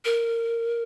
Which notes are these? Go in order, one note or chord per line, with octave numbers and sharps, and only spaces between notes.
A#4